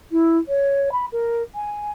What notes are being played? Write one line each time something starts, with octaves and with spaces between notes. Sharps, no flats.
E4
C#5
B5
A#4
G#5